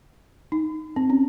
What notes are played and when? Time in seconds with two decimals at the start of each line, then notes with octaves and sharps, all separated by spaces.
0.52 D#4
0.96 C4
1.10 C#4